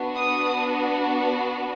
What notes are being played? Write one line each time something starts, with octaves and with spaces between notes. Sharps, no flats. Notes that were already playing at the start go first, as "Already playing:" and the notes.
Already playing: B3 D4 F#4
D#6